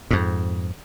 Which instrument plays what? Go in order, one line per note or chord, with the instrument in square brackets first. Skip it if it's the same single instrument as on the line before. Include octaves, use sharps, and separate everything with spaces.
[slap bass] F2 G#2